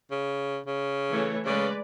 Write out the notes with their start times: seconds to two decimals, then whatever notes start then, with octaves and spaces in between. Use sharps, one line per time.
0.11 C#3
0.66 C#3
1.10 E3 A3 C#5
1.45 C#3 G#3 B4 D5